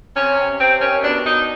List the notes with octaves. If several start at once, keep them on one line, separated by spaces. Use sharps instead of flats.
C3 C#4
C3
C3 C4
D#3 C#4
B2 D4
B2 D#4